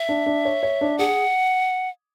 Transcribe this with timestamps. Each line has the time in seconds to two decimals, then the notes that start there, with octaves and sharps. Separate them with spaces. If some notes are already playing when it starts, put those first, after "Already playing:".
Already playing: E5
0.09 D4
0.26 D4
0.45 C#5
0.63 C#5
0.81 D4
0.98 G#4 F#5